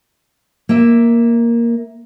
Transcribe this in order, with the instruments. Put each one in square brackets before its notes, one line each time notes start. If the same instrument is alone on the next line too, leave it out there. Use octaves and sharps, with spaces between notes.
[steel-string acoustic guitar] A#3 E5